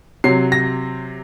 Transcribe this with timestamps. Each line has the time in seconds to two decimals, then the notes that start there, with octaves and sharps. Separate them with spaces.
0.24 C3 F#3 C7
0.52 A#6